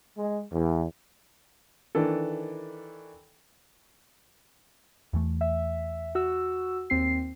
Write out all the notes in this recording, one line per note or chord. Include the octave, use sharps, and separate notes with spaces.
G#3
E2
D#3 E3 D4 A4
E2 E3 A3
E5
F#4 E6
D#2 C4 C7